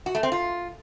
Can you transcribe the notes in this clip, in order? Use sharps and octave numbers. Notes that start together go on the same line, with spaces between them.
F#4
A3
C4
F4